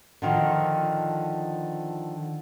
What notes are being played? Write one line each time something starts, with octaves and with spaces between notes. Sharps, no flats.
D3 D#3 F3